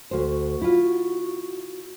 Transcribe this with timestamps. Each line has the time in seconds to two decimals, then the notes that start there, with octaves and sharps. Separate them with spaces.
0.11 D2 F#4 C5
0.62 E4 F4